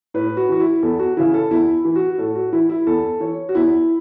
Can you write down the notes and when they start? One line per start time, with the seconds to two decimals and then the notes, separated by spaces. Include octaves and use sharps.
0.14 A2 B4
0.37 F#4
0.49 E3 F#4
0.60 E4
0.83 E2 A4
0.99 F#4
1.17 C#3 E3 E4
1.34 A4
1.50 E2 E4
1.85 E3
1.96 F#4
2.18 A2 A4
2.35 F#4
2.52 E3 E4
2.70 E4
2.87 E2 A4
3.20 E3 C#5
3.49 F#4
3.55 E2 E4